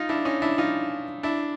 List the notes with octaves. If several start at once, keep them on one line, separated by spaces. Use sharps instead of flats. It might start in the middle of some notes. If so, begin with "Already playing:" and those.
Already playing: D#4 F4
D4 E4
C#4 D#4
D4 E4
D#4 F4
D4 E4